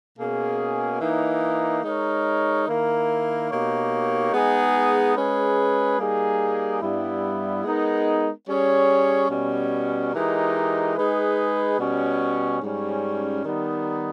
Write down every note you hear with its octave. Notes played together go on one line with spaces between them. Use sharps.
B2 A#3 C#4 G#4
E3 A#3 D#4
G#3 D#4 A#4 C#5
D#3 A#3 E4 A#4
B2 A#3 D#4 G4 C#5
G#3 B3 D#4 G#4
G#3 C#4 G#4 B4
G3 A#3 D#4 G#4
G2 G3 B3 E4
G#3 B3 D#4 A#4
G3 C#4 G#4 C#5
B2 G3 C#4
E3 G#3 D#4 G4 A#4
G#3 D#4 G#4 B4
B2 G3 C#4
G#2 G3 C#4
D#3 G3 B3 D#4